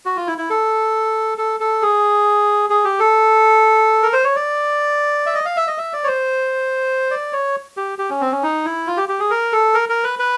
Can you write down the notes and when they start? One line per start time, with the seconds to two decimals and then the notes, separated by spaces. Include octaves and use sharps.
0.05 F#4
0.17 F4
0.27 E4
0.38 E4
0.50 A4
1.38 A4
1.60 A4
1.82 G#4
2.70 G#4
2.85 G4
3.00 A4
4.03 A#4
4.13 C5
4.24 C#5
4.36 D5
5.26 E5
5.35 D#5
5.46 F5
5.57 E5
5.67 D#5
5.78 E5
5.93 D5
6.04 C#5
6.07 C5
7.11 D5
7.33 C#5
7.77 G4
7.99 G4
8.10 C#4
8.21 C4
8.32 C#4
8.43 D#4
8.65 E4
8.87 F4
8.97 G4
9.09 G4
9.20 G#4
9.30 A#4
9.53 A4
9.74 A#4
9.89 A#4
10.04 B4
10.19 B4